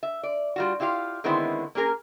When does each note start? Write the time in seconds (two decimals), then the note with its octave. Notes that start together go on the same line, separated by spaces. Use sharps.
0.03 E5
0.23 D5
0.56 G3 F4 F#4
0.80 E4 F4 G4 B4 F5
1.24 D3 D#3 G#3 B3 C4 E4
1.75 A#3 C#4 G#4 A#4